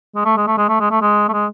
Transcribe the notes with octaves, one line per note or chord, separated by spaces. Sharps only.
G#3
A3
G#3
A3
G#3
A3
G#3
A3
G#3
A3
G#3